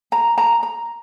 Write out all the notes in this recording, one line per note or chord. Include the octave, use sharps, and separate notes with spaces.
A#5
A#5
A#5